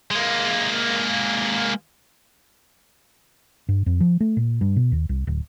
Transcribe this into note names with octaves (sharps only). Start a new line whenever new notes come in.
G#3 A#3
G2
F2
F3
A3
A#2
G2
B2
D#2
C2
D1